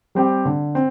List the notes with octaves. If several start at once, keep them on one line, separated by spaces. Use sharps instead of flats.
G3 C4 G4
D3
C4